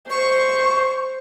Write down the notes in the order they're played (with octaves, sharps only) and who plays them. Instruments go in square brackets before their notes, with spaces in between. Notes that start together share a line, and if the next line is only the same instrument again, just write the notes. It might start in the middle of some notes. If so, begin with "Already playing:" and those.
[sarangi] C5 [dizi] C#6